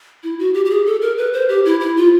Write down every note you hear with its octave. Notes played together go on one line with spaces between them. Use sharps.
E4
F#4
G4
G4
G#4
A4
A#4
B4
C5
G4
E4
E4
F4